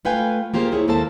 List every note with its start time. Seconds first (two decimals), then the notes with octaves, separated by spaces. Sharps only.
0.05 A3 F4 B4 F5 G5 G#5
0.54 A#3 F4 G4 G#4 C5
0.71 D2 E4 G#4 C#5
0.88 D#2 A3 A#3 A4 C5 A5